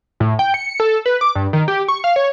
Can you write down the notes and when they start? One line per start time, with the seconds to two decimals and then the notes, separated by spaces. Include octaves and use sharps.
0.20 A2
0.39 G5
0.54 C#7
0.80 A4
1.06 B4
1.21 D6
1.35 G2
1.53 D#3
1.68 G4
1.88 C#6
2.04 F5
2.16 C#5